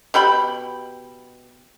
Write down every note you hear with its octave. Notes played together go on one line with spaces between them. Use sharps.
B2 G4 G5 B5